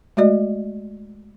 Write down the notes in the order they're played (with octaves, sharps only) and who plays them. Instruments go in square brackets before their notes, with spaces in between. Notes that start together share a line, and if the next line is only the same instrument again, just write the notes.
[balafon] G#3 A3 F#4 D5 D#5